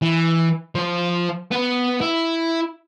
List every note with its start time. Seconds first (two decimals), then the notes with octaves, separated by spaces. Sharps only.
0.02 E3
0.75 F3 C5
1.51 B3 B4
2.01 E4